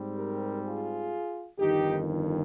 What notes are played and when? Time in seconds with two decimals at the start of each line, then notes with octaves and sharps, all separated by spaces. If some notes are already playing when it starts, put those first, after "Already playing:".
Already playing: G#2 G3 C4
0.15 G4 A#4
0.62 F4 G#4
1.58 G1 F2 D#3 D#4 G4